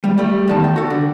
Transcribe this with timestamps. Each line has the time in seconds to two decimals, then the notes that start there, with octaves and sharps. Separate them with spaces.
0.04 G3
0.18 G3 A3
0.48 E2 D#3 A5
0.64 G5
0.76 F#4 A4
0.90 D3